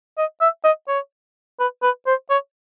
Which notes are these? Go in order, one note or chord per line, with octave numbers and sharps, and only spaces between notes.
D#5
E5
D#5
C#5
B4
B4
C5
C#5